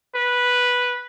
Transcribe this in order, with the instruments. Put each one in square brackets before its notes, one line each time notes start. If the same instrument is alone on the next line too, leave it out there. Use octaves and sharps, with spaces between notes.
[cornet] B4